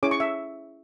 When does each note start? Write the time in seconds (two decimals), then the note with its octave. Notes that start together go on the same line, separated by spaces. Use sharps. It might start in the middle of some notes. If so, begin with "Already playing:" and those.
0.03 C#4 E4 G#4 C#5 D6
0.11 C#6
0.20 E5